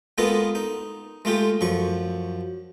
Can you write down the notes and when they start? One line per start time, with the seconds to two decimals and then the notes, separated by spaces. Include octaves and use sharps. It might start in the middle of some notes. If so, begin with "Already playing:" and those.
0.18 G#3 A#3 B3 F4 A4 D#5
0.55 D#4
1.25 G#3 A3 F4 G4
1.61 F#2 F3 C#6